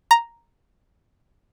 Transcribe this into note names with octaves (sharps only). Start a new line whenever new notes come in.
A#5